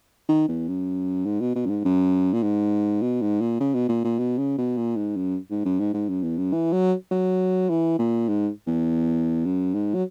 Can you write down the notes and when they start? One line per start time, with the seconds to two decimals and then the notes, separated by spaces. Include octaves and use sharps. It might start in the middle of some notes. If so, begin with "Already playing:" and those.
0.29 D#3
0.49 E2
0.68 F#2
1.26 G#2
1.41 B2
1.56 B2
1.66 F#2
1.70 G#2
1.85 F#2
2.34 A#2
2.43 G#2
3.02 B2
3.22 G#2
3.41 A#2
3.60 C#3
3.74 B2
3.89 A#2
4.05 A#2
4.19 B2
4.38 C#3
4.58 B2
4.77 A#2
4.96 G#2
5.16 F#2
5.51 G#2
5.66 F#2
5.80 G#2
5.94 G#2
6.09 F#2
6.23 E2
6.38 F#2
6.53 E3
6.73 F#3
7.12 F#3
7.70 E3
7.99 A#2
8.29 G#2
8.67 E2
9.45 F#2
9.74 G#2
9.95 F#3